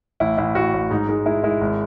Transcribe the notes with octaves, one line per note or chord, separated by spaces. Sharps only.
A1 E4
A1 E4
A1 F#4
A1
G#2 D#4
G#3 D#4
G#3 E4
G#3 E4
G#1